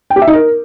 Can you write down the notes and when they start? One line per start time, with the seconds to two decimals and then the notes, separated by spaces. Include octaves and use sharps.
0.10 G5
0.16 G4
0.22 E5
0.27 D#4
0.33 A#4